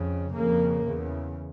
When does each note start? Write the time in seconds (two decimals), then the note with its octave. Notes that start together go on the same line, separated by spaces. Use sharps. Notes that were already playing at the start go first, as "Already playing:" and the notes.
Already playing: F2 C#3
0.34 F2 C#3 A#3
0.86 E2 C#3